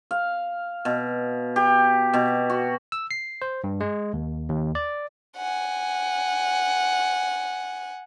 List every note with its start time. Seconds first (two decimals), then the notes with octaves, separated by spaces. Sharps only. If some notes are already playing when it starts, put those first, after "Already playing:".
0.11 F5
0.85 B2
1.56 G4
2.14 B2
2.50 F#4
2.92 E6
3.11 C7
3.42 C5
3.64 G2
3.81 G#3
4.13 D#2
4.49 D#2
4.75 D5
5.37 F#5 G#5